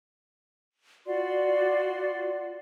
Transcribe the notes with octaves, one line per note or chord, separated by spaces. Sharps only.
F4 F#4 D5 C6